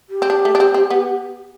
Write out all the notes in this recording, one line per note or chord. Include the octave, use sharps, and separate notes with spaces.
G4
C4
D4
A3
D4
C4
C4
B3